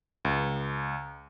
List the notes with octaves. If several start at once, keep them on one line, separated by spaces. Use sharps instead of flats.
C#2